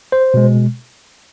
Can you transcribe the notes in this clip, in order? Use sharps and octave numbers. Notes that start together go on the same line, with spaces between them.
C5
B2 G#3